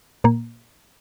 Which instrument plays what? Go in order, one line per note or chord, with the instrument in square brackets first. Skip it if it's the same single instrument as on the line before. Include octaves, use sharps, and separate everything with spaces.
[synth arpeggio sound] A#2 A#3